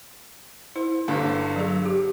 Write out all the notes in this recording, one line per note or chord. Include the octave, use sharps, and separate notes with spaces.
E4 C5
G1 G2 D3
F#3 G#4
G4